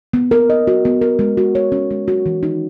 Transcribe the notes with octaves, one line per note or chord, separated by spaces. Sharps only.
B3
A#4
D#5
F#4
B3
A#4
G#3
F#4
C#5
C#4
G#3
F#4
E3
D#4